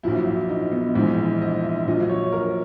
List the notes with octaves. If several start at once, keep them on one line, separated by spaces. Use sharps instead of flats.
A#1 A#2 F#3 E4
E4
D#4
B3
A#1 G#2 E3 D#4
D#5
E5
A#1 A#2 F#3 D#5
C#5
A#4